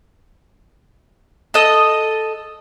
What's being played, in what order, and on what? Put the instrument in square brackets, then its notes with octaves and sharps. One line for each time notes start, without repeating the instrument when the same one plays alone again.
[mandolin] A4 D#5